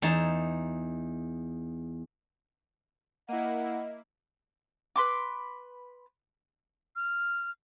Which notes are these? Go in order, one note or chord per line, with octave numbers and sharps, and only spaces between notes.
E2 D#4 A5
A#3 E4 D#5 F#5
B4 C6 D6
F6